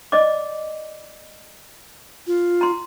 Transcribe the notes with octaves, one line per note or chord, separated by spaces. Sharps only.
D5 D#5 D6
F4
A#5 C6